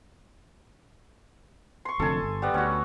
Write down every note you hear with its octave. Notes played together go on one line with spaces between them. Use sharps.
C6 C#6
F1 F2 D3 A4 G#5
G1
G3 B3 D#5
D2 C#4 F#4